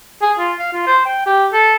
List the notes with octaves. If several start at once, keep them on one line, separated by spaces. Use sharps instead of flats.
G#4
F4
F5
F4
C5
G5
G4
A4